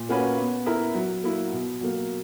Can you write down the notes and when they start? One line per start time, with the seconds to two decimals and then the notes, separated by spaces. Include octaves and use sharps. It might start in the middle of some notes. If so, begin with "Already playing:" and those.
Already playing: A#2
0.09 A#3 C#4 F#4 B4
0.37 B3
0.66 E4 A#4 E5
0.95 F#3
1.24 A#3 E4
1.52 B2
1.81 F#3 A#3